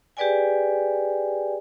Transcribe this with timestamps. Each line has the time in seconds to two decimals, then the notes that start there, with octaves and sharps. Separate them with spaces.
0.17 G4 G#4 B4 D5 G5 G#5